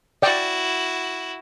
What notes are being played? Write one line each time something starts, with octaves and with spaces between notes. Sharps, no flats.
E4 F#4 D5 G5